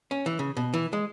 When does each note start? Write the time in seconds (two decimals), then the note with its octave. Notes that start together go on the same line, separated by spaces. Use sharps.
0.11 C#4
0.26 E3
0.39 C#3
0.57 B2
0.74 E3
0.93 G#3